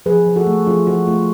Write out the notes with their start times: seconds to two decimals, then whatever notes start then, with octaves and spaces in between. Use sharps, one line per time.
0.06 F3 G#4 B4
0.26 F3
0.36 F#4 A4
0.47 A3
0.67 F3 F4 G#4
0.87 F3 F#4
1.07 A3 F4